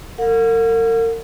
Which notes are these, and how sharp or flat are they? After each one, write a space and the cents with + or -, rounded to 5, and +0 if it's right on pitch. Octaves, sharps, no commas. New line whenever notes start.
A#4 -40 F#5 -40